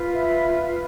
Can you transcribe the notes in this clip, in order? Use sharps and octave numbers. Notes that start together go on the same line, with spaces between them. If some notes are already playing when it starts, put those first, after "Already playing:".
Already playing: F4 B4
E5